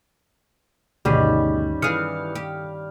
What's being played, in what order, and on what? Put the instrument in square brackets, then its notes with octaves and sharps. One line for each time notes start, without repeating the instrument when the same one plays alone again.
[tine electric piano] D2 [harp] G2 D#3 C#4 [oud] B2 G#4 [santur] G3
[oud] E3 G#4 [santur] F5 [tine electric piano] D#6 C#7
[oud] G4